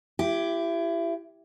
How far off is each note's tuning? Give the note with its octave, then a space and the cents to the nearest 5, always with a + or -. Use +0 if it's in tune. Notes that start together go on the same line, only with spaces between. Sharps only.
E4 +30 G4 +0